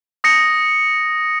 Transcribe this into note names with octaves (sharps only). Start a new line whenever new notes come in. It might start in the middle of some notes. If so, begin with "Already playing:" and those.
D#6 A#6 C#7